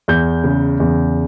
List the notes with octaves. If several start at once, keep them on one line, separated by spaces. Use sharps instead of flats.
E2 G6
C#3
E2